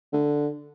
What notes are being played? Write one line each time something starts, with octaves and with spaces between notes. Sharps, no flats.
D3